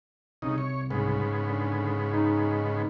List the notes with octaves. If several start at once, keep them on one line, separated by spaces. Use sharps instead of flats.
C2 C#3 D#4
C#5
G#2 C#3 B3
D3
D#4